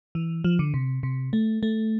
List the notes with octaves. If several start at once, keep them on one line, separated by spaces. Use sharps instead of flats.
E3
F3
D3
C3
C3
A3
A3